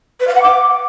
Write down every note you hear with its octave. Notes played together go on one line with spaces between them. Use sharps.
B4
F5
F#5
D6